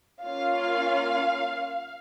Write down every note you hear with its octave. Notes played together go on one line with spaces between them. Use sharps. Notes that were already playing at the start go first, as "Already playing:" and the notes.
A#3 C#4 F4 F5